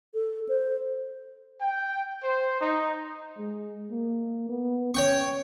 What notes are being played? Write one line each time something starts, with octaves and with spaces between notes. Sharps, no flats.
A4
C5
G5
C5
D#4
G#3
A#3
B3
C#4 C#5 G5 C#6